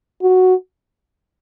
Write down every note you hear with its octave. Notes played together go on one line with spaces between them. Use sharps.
F#4